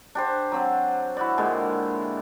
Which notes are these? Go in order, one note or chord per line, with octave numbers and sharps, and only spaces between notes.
D4 G4 C5
F#3 C4
E4 F#4 D5
A#2 D3 G#3